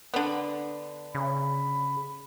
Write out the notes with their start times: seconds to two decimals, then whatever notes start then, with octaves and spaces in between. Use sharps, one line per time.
0.14 D3 B3
1.15 C#3 B5